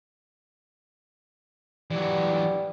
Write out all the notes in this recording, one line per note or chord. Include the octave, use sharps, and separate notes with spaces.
E3 F#3 G3